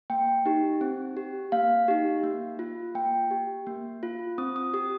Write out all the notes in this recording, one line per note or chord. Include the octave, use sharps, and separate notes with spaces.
A#3 G5
D#4 G4
C4
G4
A#3 F5
D#4 G4
A#3
F4
A#3 G5
G4
A#3
F4
C4 D#6
D#6
G4 D#6